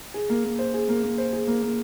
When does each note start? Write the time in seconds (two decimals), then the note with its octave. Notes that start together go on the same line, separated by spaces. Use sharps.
0.14 G#4
0.30 A#3
0.44 A#3
0.59 C5
0.74 G#4
0.89 A#3
1.03 A#3
1.18 C5
1.33 G#4
1.47 A#3
1.62 A#3